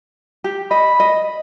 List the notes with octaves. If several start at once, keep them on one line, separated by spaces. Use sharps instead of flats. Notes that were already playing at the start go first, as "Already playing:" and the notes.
G4
D#5 B5
D#5